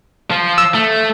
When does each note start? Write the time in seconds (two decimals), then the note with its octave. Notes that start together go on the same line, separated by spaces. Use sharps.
0.31 F3
0.58 E6
0.74 A3